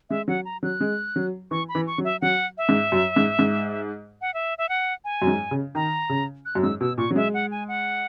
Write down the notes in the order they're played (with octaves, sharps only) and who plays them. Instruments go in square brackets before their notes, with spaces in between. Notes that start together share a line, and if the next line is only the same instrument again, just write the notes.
[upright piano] G#3 [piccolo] E5
[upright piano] F#3 [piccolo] F#5
[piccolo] A#5
[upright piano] F#3 [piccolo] F#6
[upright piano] G#3
F#3
[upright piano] E3 [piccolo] C#6
[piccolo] B5
[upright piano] E3
[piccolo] C#6
[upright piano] F#3
[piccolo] E5
[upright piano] F#3 [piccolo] F#5
[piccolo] E5
[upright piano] G#2
F#2
G#2
G#2
[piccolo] F#5
E5
E5
F#5
G#5
[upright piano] F#2
G#2
C#3
[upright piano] D#3 [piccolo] A#5
[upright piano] C#3
[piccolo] F#6
[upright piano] F#2
[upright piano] G#2 [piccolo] E6
[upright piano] B2 [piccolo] E6
[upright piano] A#2 [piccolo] C#6
[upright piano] F#3
[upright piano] G#3 [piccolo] E5
[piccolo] F#5
G#5
F#5